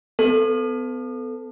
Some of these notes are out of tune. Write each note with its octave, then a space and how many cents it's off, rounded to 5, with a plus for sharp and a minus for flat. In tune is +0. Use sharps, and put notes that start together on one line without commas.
B3 +35 A4 +0